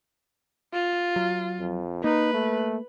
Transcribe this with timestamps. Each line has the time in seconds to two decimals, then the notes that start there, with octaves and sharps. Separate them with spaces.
0.73 F4
1.16 F#3
1.60 F2
2.04 A#3 D#4 B4
2.34 A3